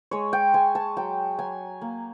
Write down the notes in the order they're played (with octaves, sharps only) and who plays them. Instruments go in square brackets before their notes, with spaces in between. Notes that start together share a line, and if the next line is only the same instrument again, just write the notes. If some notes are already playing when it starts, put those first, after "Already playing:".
[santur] G#3 C#5
G5
G#3 G#5
A5
F#3 G5
F#3 G#5
A#3